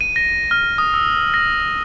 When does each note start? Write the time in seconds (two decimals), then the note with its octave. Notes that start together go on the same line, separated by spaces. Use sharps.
0.01 D#7
0.16 A#6
0.51 F6
0.78 D#6
0.94 E6
1.34 A#6